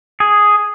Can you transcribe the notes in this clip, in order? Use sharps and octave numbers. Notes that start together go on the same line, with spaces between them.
G#4